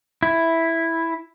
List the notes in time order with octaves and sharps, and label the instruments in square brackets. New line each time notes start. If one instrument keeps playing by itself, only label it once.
[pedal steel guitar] E4